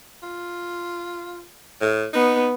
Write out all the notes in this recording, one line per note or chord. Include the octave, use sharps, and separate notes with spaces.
F4
A2
B3 D#4